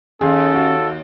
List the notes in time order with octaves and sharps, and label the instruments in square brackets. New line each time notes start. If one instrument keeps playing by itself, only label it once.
[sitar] D#2 [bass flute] C#4 [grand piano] G#4 F5 [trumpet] A4
[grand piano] F#4 F5